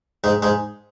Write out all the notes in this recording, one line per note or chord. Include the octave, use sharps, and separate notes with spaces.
G#2 G#3
G#2 G#3